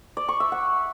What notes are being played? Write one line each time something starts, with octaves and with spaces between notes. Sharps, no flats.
D5
C#6
E5
F#5